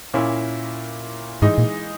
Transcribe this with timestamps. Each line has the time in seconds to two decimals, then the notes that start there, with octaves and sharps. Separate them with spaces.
0.14 A#2 A#3 C#4 E4
1.42 G#2 E3 G#3 D#4
1.58 A#2